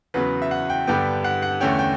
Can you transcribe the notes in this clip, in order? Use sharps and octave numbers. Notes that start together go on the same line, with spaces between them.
E2 C#3 F#3 B3 B4
E5
F#5
G5
G2 D3 G3 B3 G5
F#5
F#5
E2 D3 A3 C#4 G5
G5